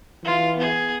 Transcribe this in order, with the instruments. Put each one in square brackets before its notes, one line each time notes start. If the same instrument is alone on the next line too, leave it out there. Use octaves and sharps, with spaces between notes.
[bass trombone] E3 [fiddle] F4
[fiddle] B3 G#4